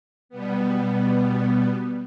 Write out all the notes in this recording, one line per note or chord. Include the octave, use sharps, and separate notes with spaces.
B2 G3 B3